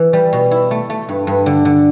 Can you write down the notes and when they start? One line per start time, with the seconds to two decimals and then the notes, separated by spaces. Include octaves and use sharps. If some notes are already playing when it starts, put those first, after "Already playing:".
Already playing: E3
0.13 G3
0.33 B2
0.51 E4
0.71 A3
0.90 A3
1.09 G2
1.27 G2
1.46 D3
1.65 D3